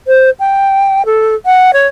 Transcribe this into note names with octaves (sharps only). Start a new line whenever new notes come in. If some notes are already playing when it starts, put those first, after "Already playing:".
C5
G5
A4
F#5
C#5